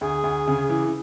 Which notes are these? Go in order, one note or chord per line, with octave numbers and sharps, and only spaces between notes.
D2 G#4
D2
C#3
E3